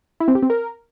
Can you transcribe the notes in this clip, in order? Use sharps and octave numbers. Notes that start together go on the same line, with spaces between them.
E4
C4
G4
C4
A#4